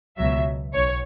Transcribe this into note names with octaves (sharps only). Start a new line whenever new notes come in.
C#2 B2 F#3 E5
B1 C#5